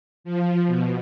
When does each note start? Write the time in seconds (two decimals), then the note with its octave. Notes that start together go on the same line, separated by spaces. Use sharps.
0.24 F3
0.67 B2